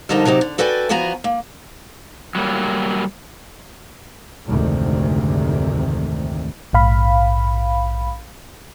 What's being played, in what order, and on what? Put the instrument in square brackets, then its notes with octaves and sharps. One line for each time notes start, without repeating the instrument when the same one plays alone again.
[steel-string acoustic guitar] F2 D3 G3 D#4 A#4 A5
C3 F#3 D#4 G4
D3
F#4 A4 B4 D5 G5 G#5
E2 F3 B3 F#4 G#5 A#5
A#3
[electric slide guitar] F#3 G3 A#3
[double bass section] F1 D2 G#2 C3 D#3
[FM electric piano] A#1 G#2 F5 B5